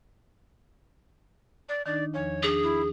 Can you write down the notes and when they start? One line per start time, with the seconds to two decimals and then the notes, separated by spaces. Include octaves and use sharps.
1.69 D5
1.86 D#3 D4 D#4 D5
2.14 E2 F3 C#5
2.43 D4 G#4 A#6
2.63 E4